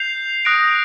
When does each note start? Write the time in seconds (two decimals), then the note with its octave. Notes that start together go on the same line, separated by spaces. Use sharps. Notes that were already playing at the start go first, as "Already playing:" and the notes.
Already playing: G6 C7 F7
0.45 D#6 F#6 A#6 D7